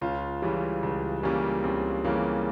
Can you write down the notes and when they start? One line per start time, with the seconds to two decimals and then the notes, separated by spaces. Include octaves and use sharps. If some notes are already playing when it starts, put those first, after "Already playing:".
0.01 C#2 C#4 F4
0.42 C#3 E3 G3
0.83 C#2
1.23 C#3 E3 G3 A#3 C#4
1.64 C#2 C4
2.05 C#3 E3 G3 A#3